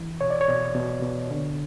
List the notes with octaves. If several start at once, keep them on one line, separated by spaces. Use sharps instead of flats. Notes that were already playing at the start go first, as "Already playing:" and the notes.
Already playing: E3
B2 C#5
D5
C#5
B2
B2
B2
D3